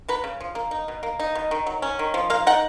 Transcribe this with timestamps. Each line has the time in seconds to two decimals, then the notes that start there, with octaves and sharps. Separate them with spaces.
0.08 F#3 B4
0.24 C#3
0.41 F3
0.55 A#3
0.71 D#4
0.88 B2
1.03 A#3
1.20 D#4
1.35 B2
1.51 D#3
1.66 F#3
1.82 C#4
1.99 D#3
2.14 F3
2.30 A#3 F5
2.47 D#4 F#5